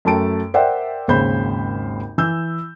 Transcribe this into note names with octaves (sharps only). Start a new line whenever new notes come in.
F#2 A3 G5 A5 D7
A#4 C5 D5 E5 F#5 G5
G#1 D#2 C#3 C5 B5 G6
E3 E6 G6